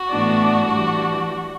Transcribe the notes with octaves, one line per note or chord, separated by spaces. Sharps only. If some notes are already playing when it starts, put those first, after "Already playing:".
Already playing: F#4
A2 E3 B3 D4
E3 G3 D4